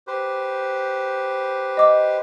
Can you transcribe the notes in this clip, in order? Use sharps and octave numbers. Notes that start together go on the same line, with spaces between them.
G4 B4 C5
D#5 D6